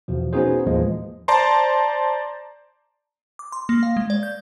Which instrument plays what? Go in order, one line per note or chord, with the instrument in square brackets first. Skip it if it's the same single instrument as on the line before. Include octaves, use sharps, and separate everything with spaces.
[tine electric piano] E2 B2 F3
B3 C#4 D#4 F#4 G#4 C5
D#2 A2 E3 F3 G#3 A#3
[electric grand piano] C5 D5 A5 A#5 C6
[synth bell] D6
C6
A#3
F5
G#3
D5
G6